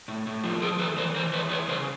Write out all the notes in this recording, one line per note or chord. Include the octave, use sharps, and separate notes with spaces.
A2
A2
F3
F3 G#4 A#4
E2 A4 B4
E3 A#4 C5
E3 A#4 C5
E2 B4 C#5
E2 B4 C#5
C#3 A#4 C5